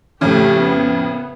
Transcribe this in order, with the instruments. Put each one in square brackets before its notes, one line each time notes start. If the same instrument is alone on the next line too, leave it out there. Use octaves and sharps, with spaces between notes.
[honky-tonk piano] F2 A2 C#3 [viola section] A3 G4
[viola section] B3